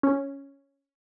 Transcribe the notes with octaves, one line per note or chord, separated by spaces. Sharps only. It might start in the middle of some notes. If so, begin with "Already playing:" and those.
C#4